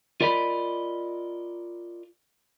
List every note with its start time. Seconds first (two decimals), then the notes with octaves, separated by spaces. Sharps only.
0.21 F4 A#4 D5 D#5 B5